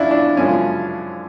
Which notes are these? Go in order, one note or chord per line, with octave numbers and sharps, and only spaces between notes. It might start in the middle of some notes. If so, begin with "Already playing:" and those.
Already playing: F#2 F3 C#4 D4 E4 F4
D4
F#2 C#3 F3 G#3 C#4